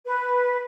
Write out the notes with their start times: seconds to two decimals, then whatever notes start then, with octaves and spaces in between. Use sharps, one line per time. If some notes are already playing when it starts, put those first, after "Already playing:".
0.06 B4